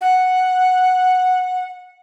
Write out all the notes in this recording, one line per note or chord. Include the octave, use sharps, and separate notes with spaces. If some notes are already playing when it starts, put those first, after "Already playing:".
F#5